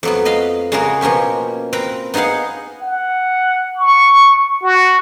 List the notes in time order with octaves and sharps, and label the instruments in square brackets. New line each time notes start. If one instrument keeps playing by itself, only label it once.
[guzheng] F2 F#3 B3
B4 D#5 F5 B5
C#3 G#3 A#3 F#4 G#4 A#4
B2 F3 A#3 C#4 G4
C4 A#4 B4 A#5 B5
B3 D#4 G#4 F5 F#5
[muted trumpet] F#5
C#6
F#4